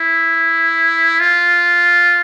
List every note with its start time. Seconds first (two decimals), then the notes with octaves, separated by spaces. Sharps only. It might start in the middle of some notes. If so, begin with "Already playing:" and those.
Already playing: E4
1.20 F4